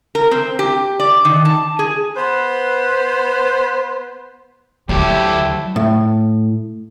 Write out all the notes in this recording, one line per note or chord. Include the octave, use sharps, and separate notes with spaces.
A#4
C4
G4
D5
D#3
A5
G#4
B3 B4 C5
D2 F#3 A3 E4 G4 A4
A2